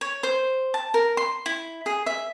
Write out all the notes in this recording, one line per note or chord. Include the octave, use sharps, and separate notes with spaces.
C#5
C5
A5
A#4
C6
E4
G#4
E5